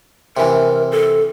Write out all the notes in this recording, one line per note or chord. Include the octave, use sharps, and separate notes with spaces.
C3 E3 A#4
A4